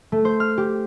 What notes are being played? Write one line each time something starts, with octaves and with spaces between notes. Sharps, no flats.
A3
C5
F6
G4